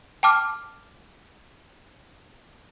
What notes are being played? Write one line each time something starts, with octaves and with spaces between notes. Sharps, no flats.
G5 A5 D6 F6